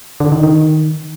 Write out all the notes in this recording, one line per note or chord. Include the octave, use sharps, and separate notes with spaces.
D3
D#3
D#3